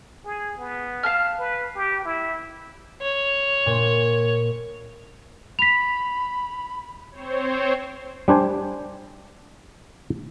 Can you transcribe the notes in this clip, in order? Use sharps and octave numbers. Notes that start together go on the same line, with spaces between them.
G#4
B3
F5 A5 F6
B4
G4
E4
C#5
A#2
B5 B6 F7
C4 C5 C#5
G3 D4 C5 G#5